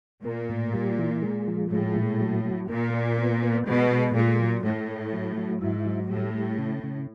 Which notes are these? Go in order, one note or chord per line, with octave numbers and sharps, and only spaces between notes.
A#2 A#3
A2
G3
E3
G#3
F3
A2 G#3
A#2
F#3
F#3
A#2 A#3
A#3
B3
B3
B2 G#3
G#3
A#2 A3
F#3
A2 A3
A3
F#3
F#3
G#2 E4
F#3
A2 G3
G3
C#3
C#3